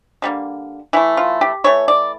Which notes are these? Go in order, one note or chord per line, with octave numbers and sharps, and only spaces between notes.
D3 G3 A#3
E3 A3 E4
F4
G4
E3 A3 C#5
D5